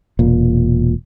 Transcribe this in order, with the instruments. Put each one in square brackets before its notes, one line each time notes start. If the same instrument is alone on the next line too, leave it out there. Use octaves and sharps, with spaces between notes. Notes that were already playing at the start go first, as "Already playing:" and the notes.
[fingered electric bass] E1 A#2